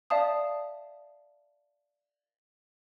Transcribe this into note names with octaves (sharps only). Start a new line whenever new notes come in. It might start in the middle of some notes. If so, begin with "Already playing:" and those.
D5 E5 F5 A5 D#6